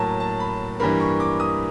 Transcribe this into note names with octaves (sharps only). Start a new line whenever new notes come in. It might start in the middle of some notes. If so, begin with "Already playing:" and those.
Already playing: A2 F#3 A#3 A5
A5
B5
G2 E3 G3 A#3 B5
C#6
D6
D#6